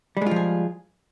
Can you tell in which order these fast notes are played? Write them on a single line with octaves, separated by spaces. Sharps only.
G3 G#3 F4 F3 G#4